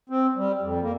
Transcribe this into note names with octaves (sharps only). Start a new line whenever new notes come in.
C4
G3
F2
A#3